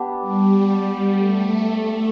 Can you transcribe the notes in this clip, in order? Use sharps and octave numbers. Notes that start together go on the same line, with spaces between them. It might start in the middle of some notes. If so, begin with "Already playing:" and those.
Already playing: B3 D4 G4
G3
A3